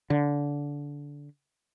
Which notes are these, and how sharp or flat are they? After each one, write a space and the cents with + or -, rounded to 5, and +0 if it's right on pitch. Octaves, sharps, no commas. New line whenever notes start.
D3 -20